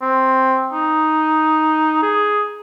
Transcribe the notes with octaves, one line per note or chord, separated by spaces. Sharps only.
C4
D#4
G#4